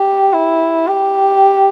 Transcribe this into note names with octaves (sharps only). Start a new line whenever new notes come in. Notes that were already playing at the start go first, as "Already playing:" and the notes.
Already playing: G4
E4
G4